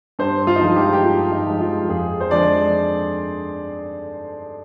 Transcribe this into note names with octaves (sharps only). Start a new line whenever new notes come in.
G2 C5
F4
D#4
F3 G#3 F4
G4
G4
G2 F4
D#4
F3 G#3
F4
F2 G#4
C5
D3 F3 G#3 D5